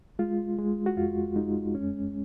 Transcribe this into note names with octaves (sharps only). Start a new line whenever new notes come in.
G#3 F4
G#3
F#4
F2 F4
G#3 D#4
F#2 C#4